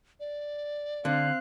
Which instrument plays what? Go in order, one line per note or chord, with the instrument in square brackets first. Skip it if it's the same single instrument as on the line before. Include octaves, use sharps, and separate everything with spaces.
[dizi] D5
[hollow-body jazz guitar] D3 [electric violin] C4 F#6 [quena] F5